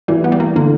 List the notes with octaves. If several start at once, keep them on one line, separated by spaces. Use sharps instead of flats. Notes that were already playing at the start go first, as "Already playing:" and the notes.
E3 G3
B3
G3
A#3
D3 A#3